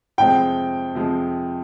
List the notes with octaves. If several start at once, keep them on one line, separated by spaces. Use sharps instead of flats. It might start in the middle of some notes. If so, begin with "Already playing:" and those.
F2 C3 F3 G#3 G5
F2 C3 F3 G#3